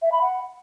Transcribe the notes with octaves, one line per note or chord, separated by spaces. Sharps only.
E5
B5
F#5